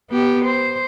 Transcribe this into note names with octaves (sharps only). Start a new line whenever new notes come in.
B3 G4
C5